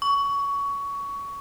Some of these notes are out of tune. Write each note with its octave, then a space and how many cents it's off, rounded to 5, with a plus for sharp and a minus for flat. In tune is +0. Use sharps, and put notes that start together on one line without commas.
C#6 +20